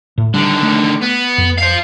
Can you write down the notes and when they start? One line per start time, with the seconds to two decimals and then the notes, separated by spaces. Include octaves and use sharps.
0.18 A2
0.34 D3 D#3 G3
0.63 A3
1.01 B3
1.38 F2
1.58 C5 F5